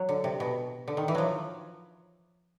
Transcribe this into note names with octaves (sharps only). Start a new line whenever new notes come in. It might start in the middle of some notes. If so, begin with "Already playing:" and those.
Already playing: F#3
D3
C3
B2
D3
D#3
E3
F3 F#3